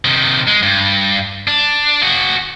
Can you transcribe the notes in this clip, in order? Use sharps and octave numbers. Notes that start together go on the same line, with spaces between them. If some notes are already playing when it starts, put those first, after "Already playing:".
C3 D#3
G#3
G2
D4
F#4 G#4